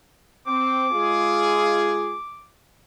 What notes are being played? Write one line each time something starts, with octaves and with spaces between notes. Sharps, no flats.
C4 D6
G#3 F4 G#4